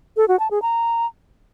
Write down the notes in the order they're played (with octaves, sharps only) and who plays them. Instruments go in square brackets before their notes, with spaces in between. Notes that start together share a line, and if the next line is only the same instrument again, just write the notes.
[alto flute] A4
F#4
A5
G#4
A#5